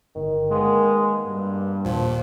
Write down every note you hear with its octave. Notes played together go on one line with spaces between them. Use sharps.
G1 D#3
G#3 A#3 B3
G2
D#2 A#2 F3